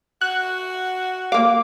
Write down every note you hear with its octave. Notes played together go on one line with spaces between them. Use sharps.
F#4 F#6
A#3 F5 D6